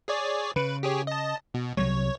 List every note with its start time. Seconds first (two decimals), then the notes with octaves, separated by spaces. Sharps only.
0.08 G#4 C#5 D5
0.56 C#3 B4
0.83 G4 G#4 C#5
1.07 D#5 A5
1.54 B2
1.77 C2 F#3 G3 C#5